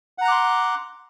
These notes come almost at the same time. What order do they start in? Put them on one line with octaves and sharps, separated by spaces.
F#5 A#5 F#6 D6 C6